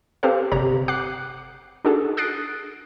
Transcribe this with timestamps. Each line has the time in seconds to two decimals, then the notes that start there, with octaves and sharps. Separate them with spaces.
0.23 C4 G4 A4 B4 C5 F5
0.52 G1 C3 G4 C#5 A#5
0.88 F#5 D6 F#6 C7
1.85 D4 D#4 F#4 G#4 A4
2.17 D#6 F#6 A6 C7 D7